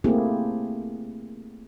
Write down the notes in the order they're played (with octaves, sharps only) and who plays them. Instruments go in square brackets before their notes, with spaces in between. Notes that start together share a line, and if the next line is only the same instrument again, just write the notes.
[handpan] A3 A#3 C4 E4 G4 G#4